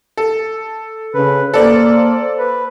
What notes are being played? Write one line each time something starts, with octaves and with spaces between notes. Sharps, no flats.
A4
C#3 B4
A#3 A4 C5 D5
B4